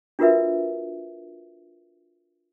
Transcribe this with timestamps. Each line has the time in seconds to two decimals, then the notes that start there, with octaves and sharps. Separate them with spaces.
0.19 D4 F4 F#4 A#4 B4 E5